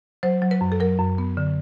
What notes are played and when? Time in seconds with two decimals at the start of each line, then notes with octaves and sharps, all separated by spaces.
0.23 F#3 C5
0.42 F#3
0.51 B4
0.61 F#2
0.72 A4
0.80 F#3 A#4
0.99 F#2
1.18 B3
1.37 D3